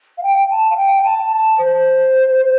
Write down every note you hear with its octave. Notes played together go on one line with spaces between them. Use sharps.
F5
G5
A5
F5
G5
G5
A5
A5
C5